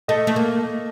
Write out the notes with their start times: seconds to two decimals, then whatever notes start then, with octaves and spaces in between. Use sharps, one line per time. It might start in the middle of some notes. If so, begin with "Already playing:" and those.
0.08 A3 D#5
0.27 A3
0.36 A#3